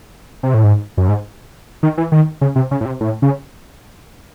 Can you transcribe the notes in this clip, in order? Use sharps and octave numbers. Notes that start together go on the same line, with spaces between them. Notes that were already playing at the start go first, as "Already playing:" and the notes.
C3
A2
G#2
F#2
G#2
D#3
E3
D#3
C#3
C3
C#3
A2
C3
A2
C#3